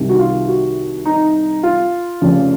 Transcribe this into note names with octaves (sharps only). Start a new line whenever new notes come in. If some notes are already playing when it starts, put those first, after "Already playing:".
Already playing: C2 C3 D#3
F#4
F4
F#4
D#4
F4
F1 F2 C#3 F3